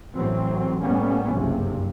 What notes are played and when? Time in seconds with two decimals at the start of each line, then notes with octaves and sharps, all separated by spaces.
0.15 A1 E3 F#3 C4
0.82 A2 G3 A#3 B3 C#4
1.33 F#1 B1 G2 C3